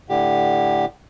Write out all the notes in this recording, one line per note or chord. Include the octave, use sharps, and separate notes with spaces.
A2 D3 G4